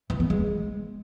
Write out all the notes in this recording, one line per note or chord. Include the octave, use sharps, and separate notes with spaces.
E3
B3
G#3